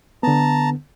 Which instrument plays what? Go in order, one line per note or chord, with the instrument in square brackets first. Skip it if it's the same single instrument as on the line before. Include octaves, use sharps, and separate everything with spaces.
[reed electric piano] D3 B3 [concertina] A5 A#5